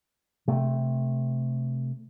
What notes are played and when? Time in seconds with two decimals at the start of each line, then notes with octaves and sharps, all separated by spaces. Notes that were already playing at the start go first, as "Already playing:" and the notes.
0.48 C3 A3